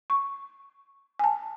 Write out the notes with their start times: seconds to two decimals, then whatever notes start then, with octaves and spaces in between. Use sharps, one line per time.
0.10 C#6
1.19 G#5 A5